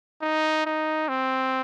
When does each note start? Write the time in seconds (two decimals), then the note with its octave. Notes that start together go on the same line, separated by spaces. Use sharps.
0.22 D#4
0.66 D#4
1.09 C4